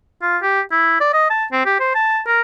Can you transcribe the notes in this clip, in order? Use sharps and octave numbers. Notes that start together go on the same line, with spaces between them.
F4
G4
E4
D5
D#5
A5
C4
G4
C5
A5
A#4